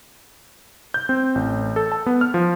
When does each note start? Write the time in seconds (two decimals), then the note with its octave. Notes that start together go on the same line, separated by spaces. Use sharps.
0.94 G6
1.09 C4
1.35 A1
1.76 A4
1.92 A5
2.06 B3
2.21 F6
2.34 F3